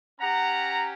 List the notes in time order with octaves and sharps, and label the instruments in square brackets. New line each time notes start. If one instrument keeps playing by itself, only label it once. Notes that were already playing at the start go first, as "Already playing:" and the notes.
[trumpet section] C#4 G4 F#5 A#5